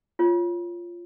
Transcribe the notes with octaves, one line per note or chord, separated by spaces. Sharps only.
F4 C#5